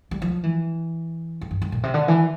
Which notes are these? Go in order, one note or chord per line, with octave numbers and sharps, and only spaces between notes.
G3
F3
E3
F2
G2
F2
A#2
C3
D3
E3